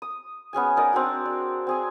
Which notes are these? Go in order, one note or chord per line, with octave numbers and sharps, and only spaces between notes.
D#6
B3 C#4 G#4 G#5
D#4 A#4 D5 D#5
C4 D4 F#4
D5
C4 G#4 G#5